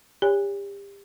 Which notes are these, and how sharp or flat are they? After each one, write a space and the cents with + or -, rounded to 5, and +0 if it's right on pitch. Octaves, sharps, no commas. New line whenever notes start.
G4 +30 C#5 +35 G#5 -35